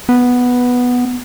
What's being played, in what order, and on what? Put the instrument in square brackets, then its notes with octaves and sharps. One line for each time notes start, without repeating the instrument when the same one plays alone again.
[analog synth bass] B3